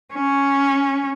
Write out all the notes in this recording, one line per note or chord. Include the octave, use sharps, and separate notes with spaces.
C#4